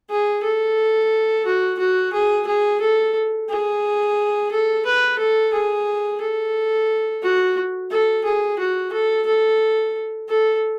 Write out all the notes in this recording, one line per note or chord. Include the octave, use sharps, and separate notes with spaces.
G#4
A4
F#4
F#4
G#4
G#4
A4
G#4
A4
B4
A4
G#4
A4
F#4
A4
G#4
F#4
A4
A4
A4